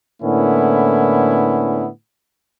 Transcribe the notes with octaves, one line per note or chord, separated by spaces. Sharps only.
A2 D3 A#3 B3 C#4 E4